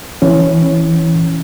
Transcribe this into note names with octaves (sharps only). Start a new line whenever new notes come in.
E3 C#4